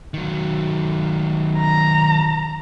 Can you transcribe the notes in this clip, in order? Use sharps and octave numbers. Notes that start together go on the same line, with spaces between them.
D#3 F#3
A#5